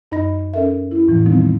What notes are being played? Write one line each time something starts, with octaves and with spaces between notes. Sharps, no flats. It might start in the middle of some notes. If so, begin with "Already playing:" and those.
F#2 D#4 D#5 B5 A#6
C#4 A4 A#4 E5
E4
E2 A2 E3 F3
D#3 F3 G3 B3 C4 D#4